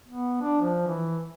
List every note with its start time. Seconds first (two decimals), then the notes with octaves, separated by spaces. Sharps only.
0.09 B3
0.42 D4
0.61 F3
0.87 E3